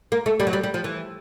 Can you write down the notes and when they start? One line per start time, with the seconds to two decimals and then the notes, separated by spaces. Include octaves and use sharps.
0.12 A#3
0.26 A3
0.40 G3
0.47 F#3
0.53 G3
0.64 G3
0.74 F3
0.84 E3